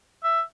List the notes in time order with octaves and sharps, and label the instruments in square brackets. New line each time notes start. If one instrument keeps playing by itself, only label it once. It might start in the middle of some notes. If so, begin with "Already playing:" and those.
[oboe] E5